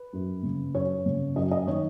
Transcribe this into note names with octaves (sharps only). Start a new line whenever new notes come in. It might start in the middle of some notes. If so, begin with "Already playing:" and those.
Already playing: B4
F#2
C#3
F#2 C#5
C#3
F#2 D#5
D#5
D#3 C#5